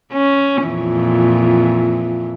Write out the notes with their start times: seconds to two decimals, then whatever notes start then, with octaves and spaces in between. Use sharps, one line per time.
0.13 C#4
0.64 F2 A#2 E3